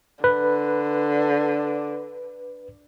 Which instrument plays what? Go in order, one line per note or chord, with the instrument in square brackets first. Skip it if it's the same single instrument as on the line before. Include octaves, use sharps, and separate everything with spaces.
[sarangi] D3 [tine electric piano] B4